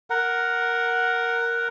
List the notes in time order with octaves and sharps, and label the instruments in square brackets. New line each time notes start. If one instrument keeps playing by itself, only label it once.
[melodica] A#4 F#5